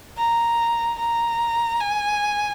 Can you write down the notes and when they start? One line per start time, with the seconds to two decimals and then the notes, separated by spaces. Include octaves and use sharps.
0.17 A#5
0.99 A#5
1.80 G#5